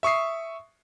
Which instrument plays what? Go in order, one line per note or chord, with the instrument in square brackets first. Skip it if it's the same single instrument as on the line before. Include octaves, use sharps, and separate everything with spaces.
[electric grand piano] E5 C#6 D#6 C7